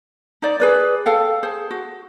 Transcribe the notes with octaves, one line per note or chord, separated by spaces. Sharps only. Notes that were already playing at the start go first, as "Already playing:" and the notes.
D#4 C5 D5
G#4 B4 D5
A4 F5 G5
G#4 C5
F#4